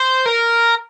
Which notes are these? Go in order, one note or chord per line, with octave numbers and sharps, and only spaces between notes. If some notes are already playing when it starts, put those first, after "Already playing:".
Already playing: C5
A#4